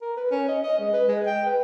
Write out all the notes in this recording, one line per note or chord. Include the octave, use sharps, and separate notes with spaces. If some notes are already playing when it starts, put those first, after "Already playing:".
A#4
B4
C#4
D#5
D#5
G#3
B4
G#3
G5
B4